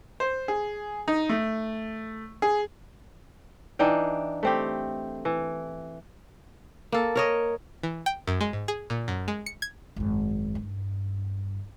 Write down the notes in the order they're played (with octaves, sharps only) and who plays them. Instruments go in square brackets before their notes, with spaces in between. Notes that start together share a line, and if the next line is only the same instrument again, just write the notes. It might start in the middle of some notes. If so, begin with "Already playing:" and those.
[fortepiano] C5
G#4
D#4
A3
G#4
[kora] E3 D4 D#4 G5
A3 C4 G4
E3
A#3 A4
A#4 C#5 D#5
[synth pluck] E3
G5
F#2
G#3
G#2
G#4
A#2
F#2
G#3
C#7
G#6
[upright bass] G#1 F#2
G2